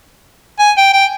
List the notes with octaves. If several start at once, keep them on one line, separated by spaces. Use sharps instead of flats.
G#5
G5
G5